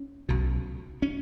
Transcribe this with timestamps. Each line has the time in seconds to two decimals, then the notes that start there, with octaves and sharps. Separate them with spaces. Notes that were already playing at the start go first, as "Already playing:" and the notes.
Already playing: C#4
0.29 B1 B2
1.02 C#4